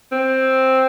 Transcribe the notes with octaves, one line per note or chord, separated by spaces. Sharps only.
C4